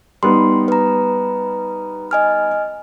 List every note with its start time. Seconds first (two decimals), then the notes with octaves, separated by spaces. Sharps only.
0.23 G3 B3 D#4 C6
0.68 B4 A#5
2.11 D#5 G#5 F6